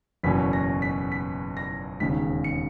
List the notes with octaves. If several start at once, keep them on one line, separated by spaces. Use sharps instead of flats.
F#1 E2 B2 A#3 C#4 B6
A#6
B6
B6
A#6
E1 D#2 C#3 B6
C#7